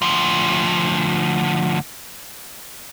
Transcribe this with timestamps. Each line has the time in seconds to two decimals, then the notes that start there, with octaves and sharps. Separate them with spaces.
0.02 D2 F3